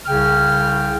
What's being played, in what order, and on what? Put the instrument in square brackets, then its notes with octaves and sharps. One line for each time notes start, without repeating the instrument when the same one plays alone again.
[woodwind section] C2 C#3 G5 F6